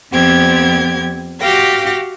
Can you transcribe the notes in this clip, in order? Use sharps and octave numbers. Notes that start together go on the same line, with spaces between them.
F2 F3 B3 C4 G4 G#6
F#4 G4 F5 G5 A#6